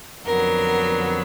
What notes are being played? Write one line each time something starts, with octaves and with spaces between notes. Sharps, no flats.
F2 D3 F#3 B3 A#4